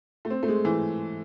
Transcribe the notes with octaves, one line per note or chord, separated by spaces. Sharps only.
A3
C4
A3
G#3
E3